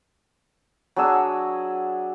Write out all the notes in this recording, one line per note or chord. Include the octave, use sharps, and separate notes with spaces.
F#3 D4 G#4 E6